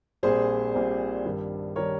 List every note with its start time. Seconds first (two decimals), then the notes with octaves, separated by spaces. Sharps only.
0.23 A#1 A#2 G3 C4 G#4 C5
0.74 A#1 A#2 G3 C4
1.25 G2 D#3 G3
1.76 D#3 G3 A#4 C#5